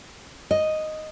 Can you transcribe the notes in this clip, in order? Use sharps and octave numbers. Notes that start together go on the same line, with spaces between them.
D#5